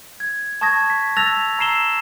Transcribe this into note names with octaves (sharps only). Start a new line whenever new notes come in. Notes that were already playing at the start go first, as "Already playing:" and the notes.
G#6
A5 C#6 D#6 G#6 A#6
B6
A5 E6 F#6 A6 A#6 F7
A#5 E6 C7 E7 G7